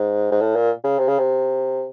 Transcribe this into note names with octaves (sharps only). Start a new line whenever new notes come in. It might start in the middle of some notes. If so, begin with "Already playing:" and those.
Already playing: G#2
G#2
A2
A#2
C#3
C3
C#3
C3